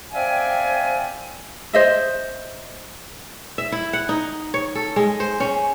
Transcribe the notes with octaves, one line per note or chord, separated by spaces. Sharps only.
C4 D5 E5 F5 G5 G#5
C5 D#5 E5
E5
E4
F#5
D#4
C#5
A4
G#3
C5
C#4